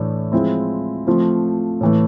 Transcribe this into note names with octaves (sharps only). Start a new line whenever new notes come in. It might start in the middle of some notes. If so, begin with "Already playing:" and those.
Already playing: A2 E3 A3 D4
F3 G#3 C4 E4
F3 A3 C4 F4
A2 E3 A3